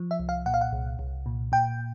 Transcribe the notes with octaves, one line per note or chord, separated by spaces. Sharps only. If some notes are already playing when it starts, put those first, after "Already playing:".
Already playing: F3
E5
C2
F5
A#2 F#5
F5
F#5
C2
C2
A#2
A#2 G5